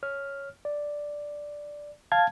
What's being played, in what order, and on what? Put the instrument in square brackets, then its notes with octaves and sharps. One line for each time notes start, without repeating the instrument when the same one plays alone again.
[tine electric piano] C#5 F6
D5
[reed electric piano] F5 A5 G#6